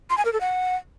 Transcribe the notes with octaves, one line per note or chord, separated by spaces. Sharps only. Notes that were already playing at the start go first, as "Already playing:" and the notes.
C6
G#5
A#4
A4
F#5